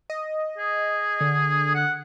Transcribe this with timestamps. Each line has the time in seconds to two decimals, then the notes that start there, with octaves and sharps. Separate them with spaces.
0.10 D#5
0.58 G#4
1.21 D3
1.75 F#5